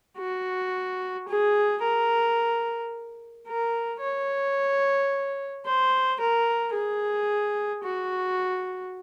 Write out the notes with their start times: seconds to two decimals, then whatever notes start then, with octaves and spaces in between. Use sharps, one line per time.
0.18 F#4
1.28 G#4
1.83 A#4
3.47 A#4
4.01 C#5
5.65 C5
6.20 A#4
6.74 G#4
7.85 F#4